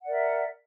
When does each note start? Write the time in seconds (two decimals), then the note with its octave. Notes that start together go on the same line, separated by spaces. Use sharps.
0.02 F#5
0.04 D5
0.07 A#4
0.10 E5